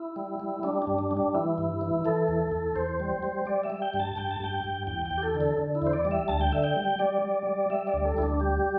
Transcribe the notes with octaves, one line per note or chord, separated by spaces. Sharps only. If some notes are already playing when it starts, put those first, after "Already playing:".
Already playing: E4
G3
G3
G3 D4
D4
G2
D4
G3
D4
E3 E4
G2
E3
E3 A4
E2
E2
E2 C5
G3
G3
G3 D5
E5
G3
G5
G2
A5
G2 G5
A5
G2 G5
G2
E2 G5
G5
E2
G4
A4
D3
A4
D3
E4
E2 C5
D5
G3
E5
D2 A5
G5
D3 E5
G5
G3
G3 D5
G3
G3
G3 E5
D5
D2
A4
D2 E4
D4
G3 G4